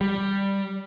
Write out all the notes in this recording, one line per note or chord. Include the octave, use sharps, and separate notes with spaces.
G3